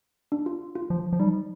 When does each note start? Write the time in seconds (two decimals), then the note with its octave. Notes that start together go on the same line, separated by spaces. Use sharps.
0.32 D4
0.46 F4
0.75 F4
0.90 F3
1.13 F3
1.20 G3 D#4